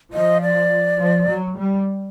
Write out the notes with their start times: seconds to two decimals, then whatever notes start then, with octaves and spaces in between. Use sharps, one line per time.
0.13 F3 D#5
0.42 D5
0.99 F3
1.28 F#3
1.57 G3